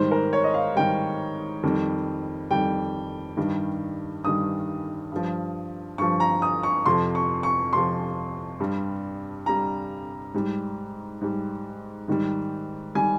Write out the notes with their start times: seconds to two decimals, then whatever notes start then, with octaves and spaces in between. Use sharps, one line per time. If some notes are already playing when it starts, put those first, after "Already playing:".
Already playing: G#2 D#3 G3 C5
0.11 A#4
0.33 C#5
0.44 D#5
0.54 F5
0.76 G#2 D#3 G3 G5
1.63 F2 D#3 G3
2.51 F2 D#3 G3 G5
3.37 G2 D#3 G3
4.24 G2 D#3 G3 D#6
5.12 G2 F3
5.98 G2 F3 C#6
6.20 A#5
6.42 D#6
6.63 C#6
6.86 F2 C3 F3 C6
7.15 C#6
7.43 C#6
7.73 F2 C3 F3 C6
8.60 G2 G3
9.46 G2 G3 A#5
10.34 G#2 G3
11.21 G#2 G3
12.08 G#2 D#3 G3
12.95 D#3 G3 G#5